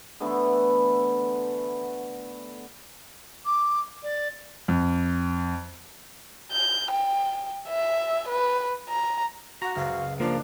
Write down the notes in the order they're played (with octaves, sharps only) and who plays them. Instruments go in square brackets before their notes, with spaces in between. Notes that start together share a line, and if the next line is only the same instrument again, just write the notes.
[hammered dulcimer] D3 E3 A3 B3
[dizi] D6
D5
[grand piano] F2
[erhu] G6
G5
E5
B4
A#5
[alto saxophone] F#4 [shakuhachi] F#5 [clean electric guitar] A#5
[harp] F#1 C#2 F6 [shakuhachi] F5
[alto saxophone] F3 [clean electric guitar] A#3 [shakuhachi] D4